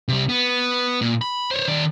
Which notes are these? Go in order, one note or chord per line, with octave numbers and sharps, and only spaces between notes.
C3 G3
B3
A#2
B5
C5 C#5
D#3 D5